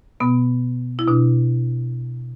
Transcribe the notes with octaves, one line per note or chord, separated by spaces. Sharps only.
B2 B3
E4
B2 D4